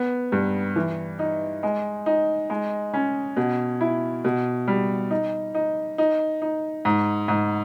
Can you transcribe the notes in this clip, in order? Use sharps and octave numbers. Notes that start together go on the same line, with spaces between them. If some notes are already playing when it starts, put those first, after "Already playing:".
Already playing: B3
G2
E3
D#4
G#3
D#4
G#3
C#4
B2
E4
B2
G3
D#4
D#4
D#4
D#4
G#2
G#2